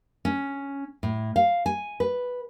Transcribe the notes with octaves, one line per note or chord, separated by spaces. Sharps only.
C#4
A2
F5
G#5
B4